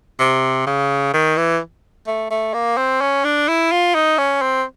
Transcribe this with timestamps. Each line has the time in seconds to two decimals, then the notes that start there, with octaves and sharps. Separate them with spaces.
0.19 C3
0.67 C#3
1.13 D#3
1.37 E3
2.07 A3
2.30 A3
2.54 A#3
2.77 C4
3.01 C#4
3.24 D4
3.48 E4
3.72 F4
3.94 D#4
4.18 C#4
4.42 C4